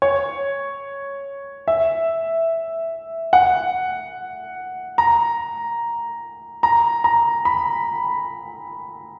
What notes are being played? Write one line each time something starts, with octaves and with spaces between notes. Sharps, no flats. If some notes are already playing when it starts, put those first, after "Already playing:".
C#5
E5
F#5
A#5
A#5
A#5
B5